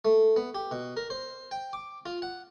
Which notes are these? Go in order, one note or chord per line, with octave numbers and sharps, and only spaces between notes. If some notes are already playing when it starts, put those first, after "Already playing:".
A3
B3
G4
B2
A#4
C5
G5
D6
F4
F#5